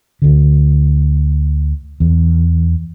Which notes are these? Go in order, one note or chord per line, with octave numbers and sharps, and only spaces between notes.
D2 D3
E2